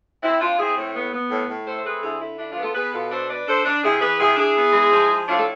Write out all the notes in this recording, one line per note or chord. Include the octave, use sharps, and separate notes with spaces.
C4 E4
C4 D4 F4
C4 E4 G#4
A2
B3
B3
A2
A2
A3 A4 C5
C5
C4 G#4 B4
D3 E4 G#4
D3 E4
D4 E4
D4 F4
B3
F4 A4
B3 G#4 B4
B2 F4 A4
D4 A4 C5
D4 B4 D5
D4 A4 C5
D4
C3 E4 G#4
E3 G#4 B4
C3 E4 G#4
D4 E4 G#4
B3
G#3
F3
F3
A2 D4 F4
A4